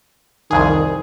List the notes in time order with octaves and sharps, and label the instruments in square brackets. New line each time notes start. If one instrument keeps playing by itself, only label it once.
[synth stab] C2 F2 G#4 [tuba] D#3